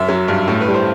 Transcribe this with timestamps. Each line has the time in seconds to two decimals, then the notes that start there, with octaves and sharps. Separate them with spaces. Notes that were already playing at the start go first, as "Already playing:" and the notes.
Already playing: F#2 E5
0.08 F#3
0.28 G2
0.48 A2
0.61 B4
0.68 G3
0.74 C5